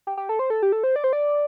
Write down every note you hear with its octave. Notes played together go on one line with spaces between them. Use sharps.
G4
G4
A4
C5
A4
G4
A4
C5
D5
C5
D5